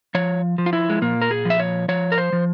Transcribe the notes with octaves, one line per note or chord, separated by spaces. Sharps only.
F3 C#5
F3
F4
E4
G#3
A#2 A#3
A#4
G#4
F3
E5
C#5
F3 C#5
A#4
C5
F3